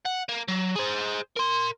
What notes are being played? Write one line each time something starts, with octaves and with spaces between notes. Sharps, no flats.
F#5
A#3
F#3
G#4 C5
A#4 C6